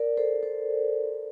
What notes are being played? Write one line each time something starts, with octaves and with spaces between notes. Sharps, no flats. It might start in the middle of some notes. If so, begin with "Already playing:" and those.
Already playing: A#4 D5
A4 C5
A4 C5